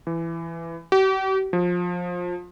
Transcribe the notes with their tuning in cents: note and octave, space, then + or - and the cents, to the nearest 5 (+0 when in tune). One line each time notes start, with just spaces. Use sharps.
E3 +15
G4 -45
F3 +20